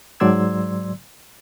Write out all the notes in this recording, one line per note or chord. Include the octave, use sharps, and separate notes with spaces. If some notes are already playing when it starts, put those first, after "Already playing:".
G#2 F#3 D5 C6 E6 G#6